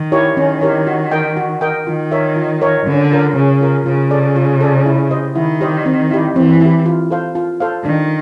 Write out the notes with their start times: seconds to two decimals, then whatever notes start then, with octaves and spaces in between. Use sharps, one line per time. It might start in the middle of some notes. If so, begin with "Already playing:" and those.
Already playing: D#3
0.12 E4 G4 A#4 C#5
0.37 D#3 C#4
0.61 E4 G4 A#4 C#5
0.87 F#4
1.12 A#4 D#5 G5
1.37 F#4
1.61 A#4 D#5 G5
1.87 D#3 F4
2.12 A#4 C#5 E5
2.36 F4
2.61 A#4 C#5 E5
2.86 D3 C#4
3.12 F4 A#4
3.36 C#3 C#4
3.61 F4 A#4
3.86 C#3 F4
4.11 A4 D5
4.36 F4
4.61 A4 D5
4.86 E4
5.11 G4 C5 D#5
5.36 D#3 E4
5.61 G4 C5 D#5
5.86 C4
6.11 E4 G4
6.35 E3 C4
6.61 E4 G4
6.86 F4
7.11 A4 C5 F5
7.35 F4
7.60 A4 C5 F5
7.85 D#3 D4